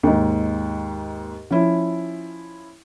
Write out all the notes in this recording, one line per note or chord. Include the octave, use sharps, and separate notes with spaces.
D#2 G#2
F3 C#4 E4